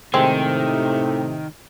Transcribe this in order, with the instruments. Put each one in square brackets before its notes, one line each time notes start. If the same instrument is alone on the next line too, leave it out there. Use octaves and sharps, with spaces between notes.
[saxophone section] A2 C3 [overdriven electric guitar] D#3 [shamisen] G#3 C4